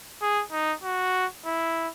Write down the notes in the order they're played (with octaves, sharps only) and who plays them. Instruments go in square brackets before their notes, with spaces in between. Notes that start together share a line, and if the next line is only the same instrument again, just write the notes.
[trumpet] G#4
D#4
F#4
E4